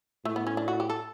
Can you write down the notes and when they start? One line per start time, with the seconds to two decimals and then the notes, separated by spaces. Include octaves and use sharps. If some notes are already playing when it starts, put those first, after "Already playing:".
0.25 A2 A3
0.36 B3
0.47 C#4
0.57 D4
0.68 F#4
0.80 G4
0.90 A4